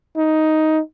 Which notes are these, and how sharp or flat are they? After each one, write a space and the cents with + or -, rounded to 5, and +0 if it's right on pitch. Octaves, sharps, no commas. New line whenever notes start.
D#4 +10